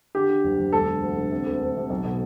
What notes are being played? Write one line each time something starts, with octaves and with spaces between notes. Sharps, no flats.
D3 G4
D3
F#1
F#1
E1 A4
D3
D2
D3
C3
D2
D2
C3
B1
B2